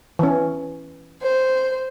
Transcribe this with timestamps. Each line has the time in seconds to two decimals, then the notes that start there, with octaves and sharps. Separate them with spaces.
0.19 E3 C#4
1.22 C5